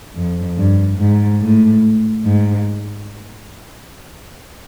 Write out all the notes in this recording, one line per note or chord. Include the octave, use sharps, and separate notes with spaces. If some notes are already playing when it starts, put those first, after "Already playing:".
F2
G2
G#2
A2
G#2